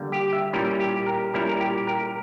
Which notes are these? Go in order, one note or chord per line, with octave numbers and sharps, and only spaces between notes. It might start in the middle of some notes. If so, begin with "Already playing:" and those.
Already playing: D3 G3 A#3
G4
E5
A#2 G3 C#4 E4 A#4
G4
A#4
A#2 G3 C#4 E4 A#4
A#4
G4
A#4